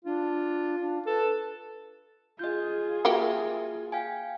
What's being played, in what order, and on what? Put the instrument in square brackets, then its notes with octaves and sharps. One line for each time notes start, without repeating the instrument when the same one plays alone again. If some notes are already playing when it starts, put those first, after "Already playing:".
[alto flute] D4 [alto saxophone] F4
[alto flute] D4
[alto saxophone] A4 [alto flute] B4
[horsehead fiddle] F4 G#4 [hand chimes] D#5 G6
[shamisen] A#3 F#4 G4 [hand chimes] E5
[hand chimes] F5 G5 G#5